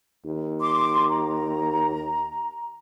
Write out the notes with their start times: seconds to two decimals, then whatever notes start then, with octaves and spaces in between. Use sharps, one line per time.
0.25 D#2
0.60 C6 D6
1.09 A#5